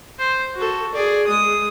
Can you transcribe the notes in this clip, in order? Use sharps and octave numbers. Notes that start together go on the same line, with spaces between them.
C5
F#4 A4
G#4 D5
G#3 D#6